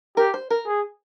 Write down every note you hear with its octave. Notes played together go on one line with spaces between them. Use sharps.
G4 A#4
C5
A#4
G#4